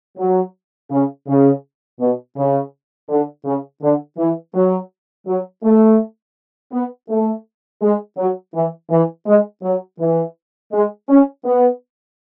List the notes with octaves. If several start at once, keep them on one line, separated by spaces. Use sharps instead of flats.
F#3
C#3
C#3
B2
C#3
D3
C#3
D3
E3
F#3
F#3
A3
B3
A3
G#3
F#3
E3
E3
G#3
F#3
E3
G#3
C#4
B3